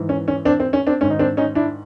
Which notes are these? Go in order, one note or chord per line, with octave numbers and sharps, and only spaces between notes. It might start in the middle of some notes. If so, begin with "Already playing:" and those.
Already playing: G#2 E3
C#4
C#4
C4 D4
C4
C#4
C4 D4
G#2 D#3 C#4
D#4
C4 D4
C#4 D#4
D4 E4